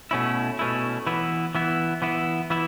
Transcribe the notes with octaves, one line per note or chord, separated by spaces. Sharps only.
B2 A3 C#4 E4
B2 A3 C#4 E4
E3 B3 E4
E3 B3 E4
E3 B3 E4
E3 B3 E4